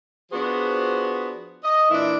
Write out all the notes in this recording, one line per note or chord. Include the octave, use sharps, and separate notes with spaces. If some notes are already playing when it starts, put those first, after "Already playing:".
F3 B3 D4 F#4 G#4 C5
D#5
A#2 E3 D4 E4